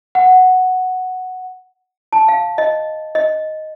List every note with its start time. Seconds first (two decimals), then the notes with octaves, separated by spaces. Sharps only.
0.15 F#5
2.13 A5
2.28 F5
2.58 D#5
3.15 D#5